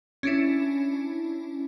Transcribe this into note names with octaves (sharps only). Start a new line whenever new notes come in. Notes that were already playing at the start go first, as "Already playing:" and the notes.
C#4 D4 E4